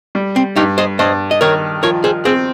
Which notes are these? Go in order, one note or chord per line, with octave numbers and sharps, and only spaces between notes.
G3
C4
G2 D#4 G4
C5 D#5
G2 C5 D#5
D#5
D#3 A#4 C#5
F3 A#4 C#5
G#4 C5
C4 G#4 C5